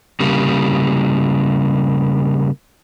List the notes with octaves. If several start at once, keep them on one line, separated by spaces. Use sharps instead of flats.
C#3 G3 A#3